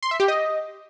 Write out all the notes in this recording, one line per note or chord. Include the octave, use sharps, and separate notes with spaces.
C6
E5
G4
D#5